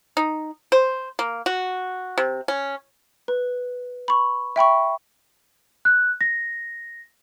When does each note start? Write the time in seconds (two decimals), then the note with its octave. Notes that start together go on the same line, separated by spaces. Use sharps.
0.17 D#4
0.72 C5
1.19 A#3
1.46 F#4
2.18 C3
2.48 C#4
3.28 B4
4.08 B5 C#6
4.56 E5 G5 B5 C#6
5.85 F#6
6.21 A#6